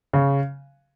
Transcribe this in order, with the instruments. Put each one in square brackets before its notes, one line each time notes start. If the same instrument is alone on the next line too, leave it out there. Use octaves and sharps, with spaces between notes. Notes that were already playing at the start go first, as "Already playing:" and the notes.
[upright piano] C#3